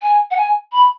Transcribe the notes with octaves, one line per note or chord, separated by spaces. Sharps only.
G#5
F#5
G#5
B5